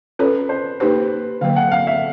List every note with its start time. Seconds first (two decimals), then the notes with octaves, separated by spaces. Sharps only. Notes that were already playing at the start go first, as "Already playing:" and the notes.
0.19 C#4 F4 A4 B4 C#5
0.49 C5
0.80 A#3 D#4 G4 B4 C5
1.41 D3 F#3 A#3 F5
1.56 F#5
1.72 F5
1.87 E5